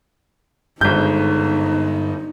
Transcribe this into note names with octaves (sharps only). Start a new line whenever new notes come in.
G#1 G2 D3 G#3 D#4 G6